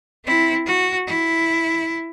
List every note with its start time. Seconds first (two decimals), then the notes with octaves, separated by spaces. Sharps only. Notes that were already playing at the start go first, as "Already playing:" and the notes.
0.25 C4 E4
0.66 F#4
1.07 E4